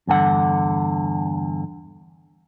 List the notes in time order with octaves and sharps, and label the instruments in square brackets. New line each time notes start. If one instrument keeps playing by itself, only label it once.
[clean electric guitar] E2 G2 D3 F#5